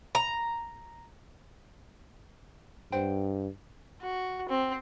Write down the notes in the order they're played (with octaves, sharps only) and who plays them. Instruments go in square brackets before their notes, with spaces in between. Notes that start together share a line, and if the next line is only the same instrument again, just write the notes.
[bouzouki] A#5
[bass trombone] G2 [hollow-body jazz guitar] C5 F#5 G5
[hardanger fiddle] F#4
C4